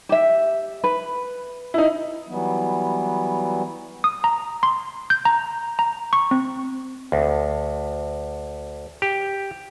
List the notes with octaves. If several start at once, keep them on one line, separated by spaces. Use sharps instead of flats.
G4 E5
B4
D#4 E4
E3 F#3 G3 B3
D#6
A#5
C6
G6
A#5
A#5
C#6
C4
D2
G4